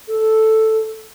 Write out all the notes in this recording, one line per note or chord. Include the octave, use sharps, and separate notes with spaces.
A4